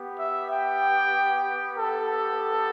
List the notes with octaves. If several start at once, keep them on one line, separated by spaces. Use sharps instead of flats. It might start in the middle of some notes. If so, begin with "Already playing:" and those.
Already playing: B3 G4
E5
G5
A4